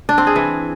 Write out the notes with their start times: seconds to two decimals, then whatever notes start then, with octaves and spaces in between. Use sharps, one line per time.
0.09 D4
0.18 C4
0.27 G#4
0.36 E3